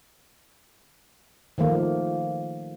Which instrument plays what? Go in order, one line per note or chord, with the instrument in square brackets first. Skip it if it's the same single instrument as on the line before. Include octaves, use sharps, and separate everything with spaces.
[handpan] D#3 F3 A3 A#3